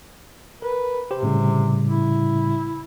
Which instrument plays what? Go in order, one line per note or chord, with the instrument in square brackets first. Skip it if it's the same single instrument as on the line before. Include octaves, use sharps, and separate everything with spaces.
[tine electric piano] A#4 [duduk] B4
[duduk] C3 [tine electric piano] G4 C5
[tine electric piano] A2 C#3 G3
[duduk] E4